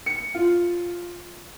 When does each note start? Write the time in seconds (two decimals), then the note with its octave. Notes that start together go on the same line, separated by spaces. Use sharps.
0.06 C#7
0.34 F4